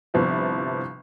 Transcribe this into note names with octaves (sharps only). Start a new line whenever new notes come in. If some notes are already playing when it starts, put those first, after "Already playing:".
G1 C3 F3 B3 E4 B4